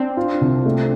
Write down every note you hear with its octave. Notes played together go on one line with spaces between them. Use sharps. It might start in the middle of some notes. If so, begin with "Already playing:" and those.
Already playing: C4 D4
F4
C2
A3